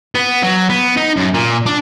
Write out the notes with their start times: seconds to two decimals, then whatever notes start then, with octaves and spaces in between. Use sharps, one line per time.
0.15 B3
0.43 F#3
0.70 B3
0.97 D#4
1.17 F#2
1.34 A#2
1.66 D4